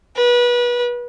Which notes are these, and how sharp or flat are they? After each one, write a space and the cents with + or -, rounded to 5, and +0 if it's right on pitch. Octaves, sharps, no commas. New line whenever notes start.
B4 -30